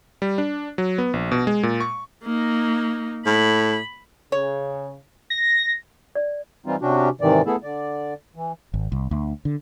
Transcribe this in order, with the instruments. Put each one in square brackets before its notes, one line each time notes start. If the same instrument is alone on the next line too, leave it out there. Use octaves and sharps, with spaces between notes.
[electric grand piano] G3
D4
F#3
B3
A#1
B2
G#3
A#2
C#6
[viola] A#3 D#4
[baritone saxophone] A2 [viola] B5
[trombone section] C#3 [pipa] C#5
[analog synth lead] A#6
[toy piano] D5
[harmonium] E3 G3 C4 D#4 F4
C3 C#4 D4 F#4 G4
G#2 C3 D#3 E3 D5
A3 B3 E4 G#4 A4
D3 D5
E3
[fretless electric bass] G#1
C2
D2
D3